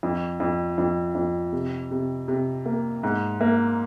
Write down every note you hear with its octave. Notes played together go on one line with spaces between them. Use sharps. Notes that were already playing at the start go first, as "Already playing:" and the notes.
F2
F2
F2
F2
C3
C3
C3
A#3
G#2
A#3